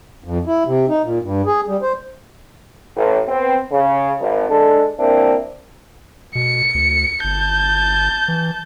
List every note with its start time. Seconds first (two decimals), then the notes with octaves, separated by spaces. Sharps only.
0.24 F2
0.47 E4
0.66 C3
0.89 D#4
1.04 A#2
1.22 G2
1.46 G#4
1.68 G3
1.82 C5
2.96 A1
3.28 B3 C4
3.70 C#3
4.20 G#1
4.49 G#3 D4 A4
4.99 A#3 C4 D4 E4 A#4
6.35 B2 C#7
6.74 D2
7.24 G1 A5 G6
8.28 E3